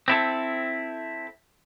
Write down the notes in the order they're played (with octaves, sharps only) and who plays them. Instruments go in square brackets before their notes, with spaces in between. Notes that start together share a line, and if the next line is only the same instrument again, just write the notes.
[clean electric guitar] C4 E4 A4